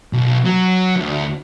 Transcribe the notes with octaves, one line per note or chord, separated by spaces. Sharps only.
B1
F#3
D2